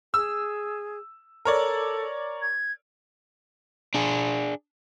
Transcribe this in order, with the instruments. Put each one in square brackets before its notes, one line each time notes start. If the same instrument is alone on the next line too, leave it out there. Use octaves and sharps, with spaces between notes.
[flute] G#4 [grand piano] E6
[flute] A4 [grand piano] A#4 C#5 D5
[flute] G#6
[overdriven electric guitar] D4 G#4